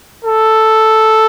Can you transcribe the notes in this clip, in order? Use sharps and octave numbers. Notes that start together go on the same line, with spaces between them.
A4